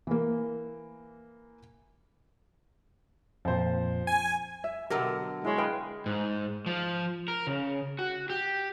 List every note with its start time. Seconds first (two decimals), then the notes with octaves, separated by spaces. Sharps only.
0.07 E3 A#3
3.45 F2 A#2 F3 C5
4.07 G#5
4.64 E5
4.90 B2 D3 F#3 G4 A4 A#4
5.45 G#3 E4 C#5
5.58 B4 D#5 F5 G5
6.06 G#2
6.66 F3
7.28 A#4
7.47 C#3
7.99 F#4
8.30 G4